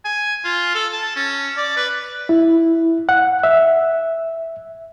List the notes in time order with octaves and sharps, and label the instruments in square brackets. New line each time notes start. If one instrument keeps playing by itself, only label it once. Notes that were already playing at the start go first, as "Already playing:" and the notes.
[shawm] G#5
F4
A4
A5
C#4
D5
B4
[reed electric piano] E4
F#5
E5